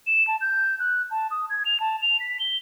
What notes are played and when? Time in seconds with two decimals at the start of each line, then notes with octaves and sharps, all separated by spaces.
0.07 E7
0.28 A5
0.41 G6
0.80 F#6
1.11 A5
1.31 D#6
1.50 G#6
1.66 F7
1.80 A5
2.02 F7
2.20 B6
2.40 G7